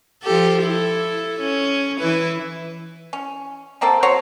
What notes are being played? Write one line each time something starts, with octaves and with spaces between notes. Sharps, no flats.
F3 G4 A4
E4 A4
C#4
E3 E4 B4
C#4
F3 A#3 C4 A4
F#3 F#4 C5 C#5